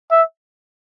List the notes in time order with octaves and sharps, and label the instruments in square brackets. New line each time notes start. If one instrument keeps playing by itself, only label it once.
[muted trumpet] E5